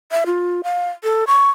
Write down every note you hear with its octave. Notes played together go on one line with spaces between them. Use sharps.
E5
F4
F5
A4
C#6